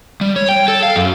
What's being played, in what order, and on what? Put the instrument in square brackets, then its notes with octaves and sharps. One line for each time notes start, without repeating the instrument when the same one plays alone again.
[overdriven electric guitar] G3
C#5
G5
A4
F5
F#2